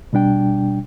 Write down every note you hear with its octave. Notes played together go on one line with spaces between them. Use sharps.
B2 G3 D4 G5